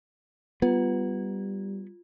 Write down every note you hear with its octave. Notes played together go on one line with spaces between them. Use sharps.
G3 B3 F4